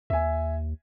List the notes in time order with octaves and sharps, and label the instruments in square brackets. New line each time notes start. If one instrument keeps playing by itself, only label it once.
[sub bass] D#2 [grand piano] E5 G#5